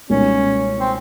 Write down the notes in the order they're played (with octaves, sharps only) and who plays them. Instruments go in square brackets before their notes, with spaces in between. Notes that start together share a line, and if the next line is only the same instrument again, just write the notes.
[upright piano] C#2 B2 G3 A#3 D#4 [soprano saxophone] C#4
[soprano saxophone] C4